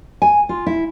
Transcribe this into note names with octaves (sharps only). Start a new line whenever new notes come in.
G#5
F4
E4